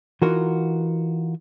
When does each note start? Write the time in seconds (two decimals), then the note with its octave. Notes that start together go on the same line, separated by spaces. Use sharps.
0.22 E3 D#4 F4 F#4 A#4